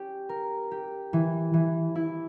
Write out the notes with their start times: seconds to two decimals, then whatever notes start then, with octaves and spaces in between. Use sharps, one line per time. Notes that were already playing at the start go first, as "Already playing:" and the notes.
Already playing: C#4 G4
0.29 A#4
0.71 G4
1.13 E3
1.53 E3
1.95 E4